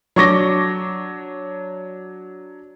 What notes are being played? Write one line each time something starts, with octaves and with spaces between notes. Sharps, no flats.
F#3 D4 C#6 D6 A#6 G7